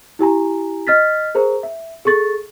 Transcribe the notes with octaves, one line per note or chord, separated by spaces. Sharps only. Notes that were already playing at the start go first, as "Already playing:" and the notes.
E4 G4 G#5 A#5
D#5 F6 A6 B6
G#4 A#4 C5 A#5
E5
G#4 A4 C#6 A6